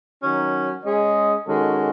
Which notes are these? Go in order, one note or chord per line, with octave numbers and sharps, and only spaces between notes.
D#3 F#3 C#4 F#4 C#5
G#3 C#4 G#4 D#5
D#3 G#3 C#4 F#4 A4